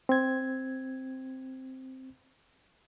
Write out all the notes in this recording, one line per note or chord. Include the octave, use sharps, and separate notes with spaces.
C4 G#6